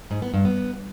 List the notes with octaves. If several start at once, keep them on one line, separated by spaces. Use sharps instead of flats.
G#2
B3
G2
B3